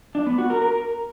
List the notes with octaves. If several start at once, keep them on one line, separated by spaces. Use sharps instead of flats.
D4
B3
F#4
A#4
A#4